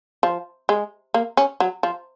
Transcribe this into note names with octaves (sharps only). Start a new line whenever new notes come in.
F3
G#3
A#3
C#4
F#3
F3